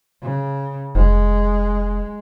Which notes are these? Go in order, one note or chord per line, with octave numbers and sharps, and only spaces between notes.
C#3
F1 G#3